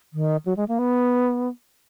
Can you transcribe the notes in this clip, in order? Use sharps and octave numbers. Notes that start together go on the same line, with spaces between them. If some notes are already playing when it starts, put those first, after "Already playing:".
D#3
F#3
G#3
A#3
B3